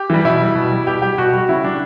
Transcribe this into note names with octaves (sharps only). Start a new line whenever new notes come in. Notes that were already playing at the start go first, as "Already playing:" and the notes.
Already playing: G4
E3 G3
B2 E4
G3
B2
G3
B2 G4
G3 G4
B2 F#4
G3
F#4
C#3 E4
G3 D4